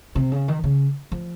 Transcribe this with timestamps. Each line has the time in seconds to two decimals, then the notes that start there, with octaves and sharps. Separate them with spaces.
0.15 C3
0.32 C#3
0.48 D#3
0.64 C#3
1.12 F3